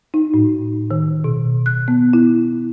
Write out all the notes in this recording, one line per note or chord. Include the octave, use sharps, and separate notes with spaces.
D#4
A2
D#3
B2
F#6
B3
E4